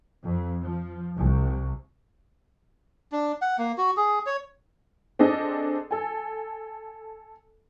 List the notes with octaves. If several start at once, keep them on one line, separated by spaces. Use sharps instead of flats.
F2
F3
C2
D4
F#5
A#3
F#4
G#4
C#5
C4 D4 G#4 A4 D#5
A4 G#5